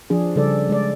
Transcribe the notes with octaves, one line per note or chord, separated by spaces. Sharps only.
F3 D4 G#4
C#3 G3 A4 D5
G#3 D5